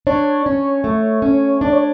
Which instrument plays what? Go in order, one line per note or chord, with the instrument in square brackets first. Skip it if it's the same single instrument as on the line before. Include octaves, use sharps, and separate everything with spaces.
[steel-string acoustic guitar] D4 [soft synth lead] C#5
[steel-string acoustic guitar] C#4
A3
C#4
[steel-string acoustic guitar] D4 [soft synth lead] D5
[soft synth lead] C#5